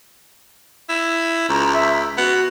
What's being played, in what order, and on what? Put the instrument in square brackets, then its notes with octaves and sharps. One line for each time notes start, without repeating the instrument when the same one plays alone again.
[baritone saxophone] E4
[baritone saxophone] C#2 [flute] A#5
[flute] E5
[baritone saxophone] B3 [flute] F#4